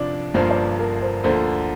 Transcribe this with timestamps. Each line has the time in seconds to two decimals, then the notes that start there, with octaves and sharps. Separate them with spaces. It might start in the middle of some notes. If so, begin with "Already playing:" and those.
Already playing: F2 C3 F3 D4 D5
0.34 G1 G2 F3 A#3 C5
0.50 D5
0.79 A#4
1.02 C5
1.24 D2 D3 F3 A#3 C5